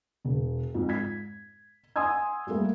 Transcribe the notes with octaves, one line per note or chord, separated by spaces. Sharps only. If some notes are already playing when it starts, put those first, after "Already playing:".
E1
F2 G#2
G#6 B6
F#5 G#5 C6 D#6 E6 G#6
G3 A3 A#3